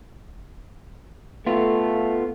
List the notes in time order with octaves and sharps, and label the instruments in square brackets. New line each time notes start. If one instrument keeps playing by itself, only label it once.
[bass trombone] A3 [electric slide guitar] B3 F4